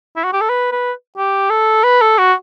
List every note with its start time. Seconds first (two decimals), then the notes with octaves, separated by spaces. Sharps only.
0.16 E4
0.24 F#4
0.33 G4
0.41 A4
0.50 B4
0.72 B4
1.17 G4
1.50 A4
1.84 B4
2.02 A4
2.18 F#4